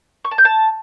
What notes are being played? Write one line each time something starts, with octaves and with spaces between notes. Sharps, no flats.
C#6
A5
G6
A5